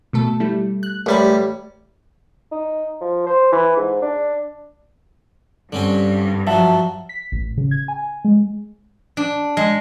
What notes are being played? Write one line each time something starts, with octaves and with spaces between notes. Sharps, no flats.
B2 A3 A4
G3 A3 E4
F#6
A1 G3 A#4 B5
D#4
F3
C5
E3
G#2
D4
G2 D3 C4 C#4
F3 F#3 E5 F#5 A5
B6
A1
C#3
G#6
G#5
G#3
D4
G#3